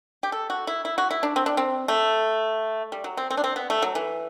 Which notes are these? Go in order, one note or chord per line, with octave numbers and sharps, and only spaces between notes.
G4
A4
F#4
E4
E4
F#4
E4
D4
C4
D4
C4
A3
G3
F#3
C4
C4
D4
C4
B3
A3
F#3
E3